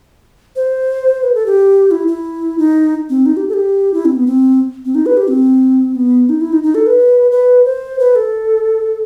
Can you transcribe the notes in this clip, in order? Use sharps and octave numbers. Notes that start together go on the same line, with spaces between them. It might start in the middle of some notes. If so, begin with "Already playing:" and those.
C5
B4
A4
G4
E4
E4
D#4
C4
D#4
G4
A4
G4
E4
C4
B3
C4
C4
D#4
B4
G4
C4
B3
D#4
E4
D#4
D#4
A4
B4
B4
C5
B4
A4